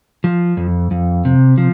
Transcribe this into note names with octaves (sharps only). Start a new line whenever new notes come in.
F3
F2
F2
C3
F3